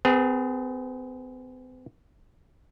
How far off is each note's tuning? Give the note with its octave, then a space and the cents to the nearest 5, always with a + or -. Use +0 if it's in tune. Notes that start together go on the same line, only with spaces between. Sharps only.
C4 -45 G#4 +0 B4 -30